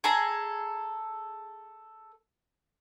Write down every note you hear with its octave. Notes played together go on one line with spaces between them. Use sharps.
G#4 A4 A#5